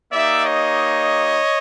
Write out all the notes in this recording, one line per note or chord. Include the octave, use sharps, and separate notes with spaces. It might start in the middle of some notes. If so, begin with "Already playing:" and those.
A#3 D#4 G4 D5 E5
C#5 D#5